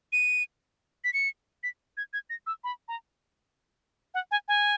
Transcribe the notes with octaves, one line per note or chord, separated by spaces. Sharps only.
D#7
B6
C#7
B6
G#6
G#6
A#6
E6
B5
A#5
F#5
G#5
G#5